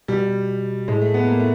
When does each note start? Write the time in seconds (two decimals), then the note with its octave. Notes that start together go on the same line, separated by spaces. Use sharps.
0.08 B2 G3
0.88 A2 G#3
1.01 A3
1.14 B3
1.27 A#3
1.40 A3